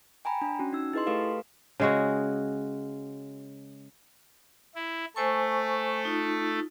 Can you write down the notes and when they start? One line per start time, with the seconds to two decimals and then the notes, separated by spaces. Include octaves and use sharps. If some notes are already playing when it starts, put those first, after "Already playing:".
0.25 G5 G#5 A#5 B5
0.42 D4
0.59 C#4 F#4
0.73 D#4 E6
0.93 E4 G#4 B4 D#5 C6
1.07 A3 G4 A4 B4 F5
1.80 C#3 G#3 F#4
4.75 E4
5.16 A3 A4 C5 G#5 C#6
6.05 D#4 F4